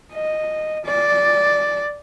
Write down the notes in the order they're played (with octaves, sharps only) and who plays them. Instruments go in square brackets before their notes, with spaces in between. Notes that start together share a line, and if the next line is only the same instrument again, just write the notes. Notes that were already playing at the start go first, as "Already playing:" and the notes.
[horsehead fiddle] D#5
D5